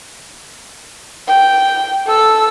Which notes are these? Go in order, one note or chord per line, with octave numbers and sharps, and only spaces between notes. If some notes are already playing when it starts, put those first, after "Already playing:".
G5
A4 E6